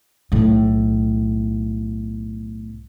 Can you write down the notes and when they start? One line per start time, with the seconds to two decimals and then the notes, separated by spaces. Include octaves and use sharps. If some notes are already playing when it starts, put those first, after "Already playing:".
0.32 B1 A2